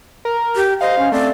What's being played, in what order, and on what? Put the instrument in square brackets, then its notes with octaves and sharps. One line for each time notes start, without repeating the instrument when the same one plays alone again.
[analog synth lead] A#4
[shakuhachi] G4
[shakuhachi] C5 [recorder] D#5 [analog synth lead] F5
[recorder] C#4
[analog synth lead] A3 [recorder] C4 [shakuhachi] D5